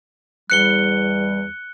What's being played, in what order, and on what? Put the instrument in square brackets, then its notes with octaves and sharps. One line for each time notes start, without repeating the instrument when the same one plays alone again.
[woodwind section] E2 G3 [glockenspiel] F#6 C#7 G7